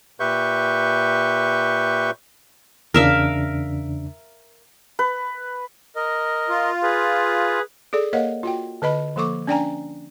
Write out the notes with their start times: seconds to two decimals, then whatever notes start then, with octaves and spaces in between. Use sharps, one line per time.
0.20 A#2 G4 B4 E5 C#6 G6
2.94 E2 C#3 D4 A#4 E5 F5
4.99 B4
5.96 A#4 D#5
6.49 F4
6.83 G#4 B4
7.93 G#4 A4 D5
8.13 A#3 A#4 C#5 D#5 F5 F#5
8.43 F4 F#4 G5
8.82 D3 B4 D#5 B5
9.16 F3 A#3 A4 C#6 D6
9.47 C#4 D4 D5 G5 G#5 A#5